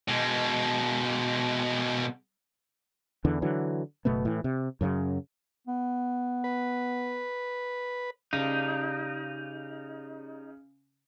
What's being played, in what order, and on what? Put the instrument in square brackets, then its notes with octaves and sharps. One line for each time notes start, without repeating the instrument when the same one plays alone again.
[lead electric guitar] B2 G#3
[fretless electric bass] E2 D3 E3
D3 E3 F#3
F#1 B2 A3 B3
A2 E3
C3
F#2 C#3 E3 F#3
[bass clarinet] B3
[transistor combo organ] B4
[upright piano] C#3 [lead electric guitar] D#4 [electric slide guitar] G4 D5 F5